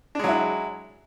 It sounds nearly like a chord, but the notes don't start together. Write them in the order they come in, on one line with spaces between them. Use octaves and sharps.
D4 G#3 F#3 E4